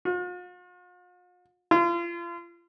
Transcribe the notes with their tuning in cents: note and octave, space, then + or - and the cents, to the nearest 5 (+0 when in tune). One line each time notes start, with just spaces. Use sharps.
F4 +45
F4 -35